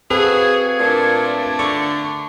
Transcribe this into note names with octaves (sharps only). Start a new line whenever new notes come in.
C4 F#4 G#4 A4 B4 F5 G#6
A#2 A3 D4
D3 C#6